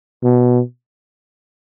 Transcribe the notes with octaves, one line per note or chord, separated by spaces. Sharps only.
B2